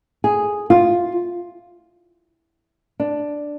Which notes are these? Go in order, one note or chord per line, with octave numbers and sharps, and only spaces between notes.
G#4
F4
D4